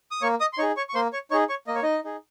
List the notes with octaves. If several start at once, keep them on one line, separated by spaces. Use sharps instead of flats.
D#6
A#3 C#5 C#6
D#5 D#6
C6
D#4 G#4 C#5 C#6
C#5 C#6
C#6
A#3 C5 C6
C#5 C#6
D#4 G#4 C#5 C#6
C#5 C#6
A#3 D#5
C#5
D#4 D#5
D#4 G#4